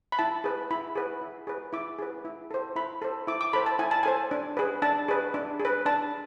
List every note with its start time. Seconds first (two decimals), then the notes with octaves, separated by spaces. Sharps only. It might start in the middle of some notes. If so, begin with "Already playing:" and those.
0.12 B5
0.19 E4 A5
0.44 G#4 B4
0.71 E4 B5
0.95 G#4 B4
1.21 E4
1.47 G#4 B4
1.73 E4 D6
1.99 G#4 B4
2.25 E4
2.51 A4 C5
2.76 E4 B5
3.02 A4 C5
3.27 E4 D6
3.41 D6
3.53 A4 C5 B5
3.66 A5
3.79 E4 G#5
3.91 A5
4.03 A4 C5 G#5
4.31 D4
4.57 G#4 B4
4.82 D4 A5
5.08 G#4 B4
5.34 D4
5.60 G#4
5.65 B4
5.86 D4 A5